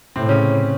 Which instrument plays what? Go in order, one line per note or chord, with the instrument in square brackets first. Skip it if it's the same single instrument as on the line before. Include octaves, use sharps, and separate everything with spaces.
[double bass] A2 [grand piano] C3 C4
[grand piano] C#3 C#4